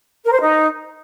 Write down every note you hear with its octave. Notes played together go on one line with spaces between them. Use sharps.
A#4
C5
D#4